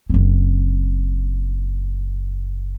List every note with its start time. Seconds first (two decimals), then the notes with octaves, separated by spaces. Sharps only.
0.10 F#1 C4